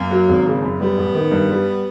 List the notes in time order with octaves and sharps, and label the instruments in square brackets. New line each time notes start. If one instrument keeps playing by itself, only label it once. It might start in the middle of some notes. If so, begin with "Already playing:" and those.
Already playing: [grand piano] F#2 [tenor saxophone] A#3
[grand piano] F#3
G#1
C#3
F#2
[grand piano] G3 [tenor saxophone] B3
[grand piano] A1
D#3
G2
G3